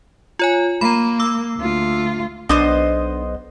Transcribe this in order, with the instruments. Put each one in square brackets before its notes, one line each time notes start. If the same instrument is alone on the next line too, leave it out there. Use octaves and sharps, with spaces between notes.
[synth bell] F4 C#5 G#5
[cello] A#3 [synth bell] A#5 B5
[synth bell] D6 E6
[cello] D2 F4
[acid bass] B1 [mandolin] B3 C5 D#5 [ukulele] D4